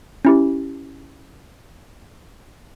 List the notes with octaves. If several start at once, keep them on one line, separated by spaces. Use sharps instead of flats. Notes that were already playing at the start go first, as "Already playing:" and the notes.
C#4 E4 G4